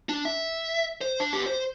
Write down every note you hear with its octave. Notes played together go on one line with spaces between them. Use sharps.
D4
E5
C5
D4
B3 G4
C5